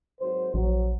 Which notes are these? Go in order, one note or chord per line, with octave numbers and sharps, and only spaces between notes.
G#1 F#3 C5
A#1 F#3